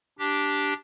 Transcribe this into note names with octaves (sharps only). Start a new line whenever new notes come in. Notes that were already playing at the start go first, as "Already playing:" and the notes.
D4 G4